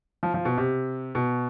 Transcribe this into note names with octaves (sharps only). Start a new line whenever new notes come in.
F3
F3
B2
C3
B2